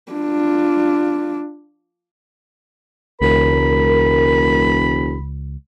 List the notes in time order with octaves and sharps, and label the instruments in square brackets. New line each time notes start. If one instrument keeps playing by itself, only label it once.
[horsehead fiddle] D4 F4
[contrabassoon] E1 [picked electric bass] C#2 [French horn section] A#4 [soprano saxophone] B5